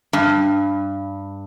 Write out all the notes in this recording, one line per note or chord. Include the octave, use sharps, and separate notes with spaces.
G2